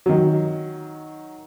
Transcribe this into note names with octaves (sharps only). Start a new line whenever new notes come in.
D#3 F#3